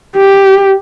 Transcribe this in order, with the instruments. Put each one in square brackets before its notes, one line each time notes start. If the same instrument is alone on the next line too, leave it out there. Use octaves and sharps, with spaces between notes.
[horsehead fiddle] G4